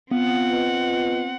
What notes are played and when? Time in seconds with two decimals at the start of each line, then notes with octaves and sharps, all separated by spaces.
0.11 B3 C4 F4 F5 F#5
0.48 F4 B4 D#5